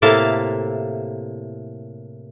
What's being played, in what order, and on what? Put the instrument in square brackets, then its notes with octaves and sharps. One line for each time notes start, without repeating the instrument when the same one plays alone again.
[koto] A2 C3 A#3 E4 F5 A5